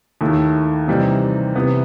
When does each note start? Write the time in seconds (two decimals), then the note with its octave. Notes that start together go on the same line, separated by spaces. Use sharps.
0.21 D#2 D#3 A3 E4
0.88 C3 E3 G3 C4 D#4
1.55 C3 E3 B3